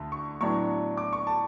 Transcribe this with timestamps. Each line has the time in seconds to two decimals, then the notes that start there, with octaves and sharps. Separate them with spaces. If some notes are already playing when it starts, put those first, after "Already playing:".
Already playing: D2 D3 A3
0.12 C#6
0.40 A2 F#3 B3 D4 C#6
0.97 D6
1.13 C#6
1.27 A5